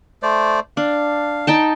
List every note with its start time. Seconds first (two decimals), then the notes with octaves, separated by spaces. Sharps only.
0.23 A3 C5 D5
0.77 D4 F5
1.47 D#4 G5 A5